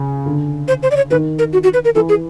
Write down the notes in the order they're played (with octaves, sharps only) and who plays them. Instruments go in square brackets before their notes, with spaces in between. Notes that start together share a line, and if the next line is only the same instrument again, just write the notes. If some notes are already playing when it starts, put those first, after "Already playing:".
Already playing: [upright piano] C#3
D3
[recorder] C5
C5
D5
C#5
[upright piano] D#3 [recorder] B4
[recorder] A#4
F#4
F#4
B4
A#4
[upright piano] E3 [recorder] A4
[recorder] G#4